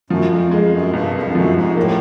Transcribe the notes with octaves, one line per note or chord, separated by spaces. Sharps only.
F#2 F3
F2
F2 G#3
F#2
C2 G2
F2
F#2 F3
G#2
A2 A#3